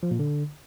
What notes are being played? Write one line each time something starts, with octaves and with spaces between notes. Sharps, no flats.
F3
A#2
D3